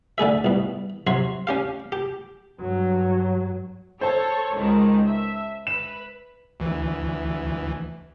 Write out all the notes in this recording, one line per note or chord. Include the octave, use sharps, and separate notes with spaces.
D3 A3 G#4 E5
C2 B2
C3 F#3 C#5 C6
C#4 G4 F5
G4
G2 F#3
A4 C5 C#5 A5 C#6
C#2 D#3 G#3
E5
B4 E7
D2 E3